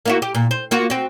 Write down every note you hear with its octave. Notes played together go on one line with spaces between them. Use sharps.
A#3 E4 F#4
G4
A#2
C5
A#3 F4 F#4
C4 F#4